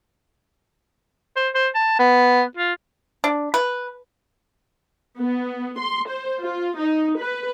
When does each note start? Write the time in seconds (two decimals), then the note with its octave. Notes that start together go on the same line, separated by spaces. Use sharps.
1.36 C5
1.55 C5
1.75 A5
1.99 B3
2.58 F4
3.24 D4
3.54 B4
5.15 B3
5.79 C6
6.08 C5
6.41 F4
6.77 D#4
7.19 B4